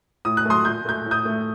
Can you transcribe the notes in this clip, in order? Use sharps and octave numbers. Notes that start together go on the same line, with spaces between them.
A2 D#6
F#6
F#3 A3 C6 D#6
A#2 G6
A3 G6
A2
D#6 G6
A3